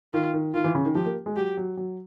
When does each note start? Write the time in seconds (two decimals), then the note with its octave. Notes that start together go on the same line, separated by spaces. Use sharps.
0.14 D#3 F4
0.34 D#3
0.54 D#3 F4
0.64 E3
0.75 C#3
0.85 D#3
0.95 F3 G4
1.06 A#3
1.26 G#3
1.36 F#3 G4
1.57 F#3
1.77 F#3